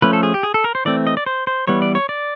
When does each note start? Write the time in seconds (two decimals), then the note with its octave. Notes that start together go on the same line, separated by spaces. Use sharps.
0.02 F3 A3 C#4 B4
0.13 A4
0.23 G#4
0.34 G4
0.43 G#4
0.54 A4
0.64 A#4
0.75 C5
0.85 E3 A3 C4 D5
1.07 D#5
1.17 D5
1.26 C5
1.47 C5
1.67 E3 G3 B3 C#5
1.82 D5
1.95 C#5
2.09 D5